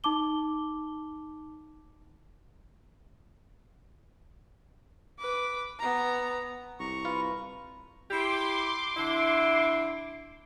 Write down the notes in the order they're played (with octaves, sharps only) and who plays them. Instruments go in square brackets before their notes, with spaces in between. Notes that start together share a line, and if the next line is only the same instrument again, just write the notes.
[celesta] D#4 A5 D6 G7
[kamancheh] B4 D6
B3 A#5
[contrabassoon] C2 [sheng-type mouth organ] A#5 C#6
[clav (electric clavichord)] F4 [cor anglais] B4
[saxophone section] E4 G4 [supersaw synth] C6 D6
[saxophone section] D3 E4